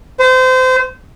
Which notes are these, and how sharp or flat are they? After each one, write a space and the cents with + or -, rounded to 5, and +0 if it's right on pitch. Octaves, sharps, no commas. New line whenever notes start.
C5 -30